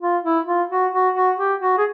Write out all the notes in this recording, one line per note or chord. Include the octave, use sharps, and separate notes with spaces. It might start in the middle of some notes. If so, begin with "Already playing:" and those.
F4
E4
F4
F#4
F#4
F#4
G4
F#4
G#4